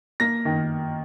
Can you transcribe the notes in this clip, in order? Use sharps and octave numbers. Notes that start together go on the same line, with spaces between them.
A#3 A#6
D#3